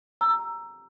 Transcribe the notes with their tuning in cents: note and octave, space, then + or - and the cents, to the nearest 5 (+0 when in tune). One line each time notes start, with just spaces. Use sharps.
A#5 +0 E6 +15